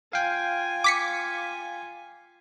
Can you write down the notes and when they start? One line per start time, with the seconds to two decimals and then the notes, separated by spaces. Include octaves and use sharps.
0.13 F4 F5 G5 G#5
0.84 D6 B6 C#7